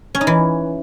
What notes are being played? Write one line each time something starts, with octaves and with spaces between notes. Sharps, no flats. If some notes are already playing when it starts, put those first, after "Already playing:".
C#4
D#4
E3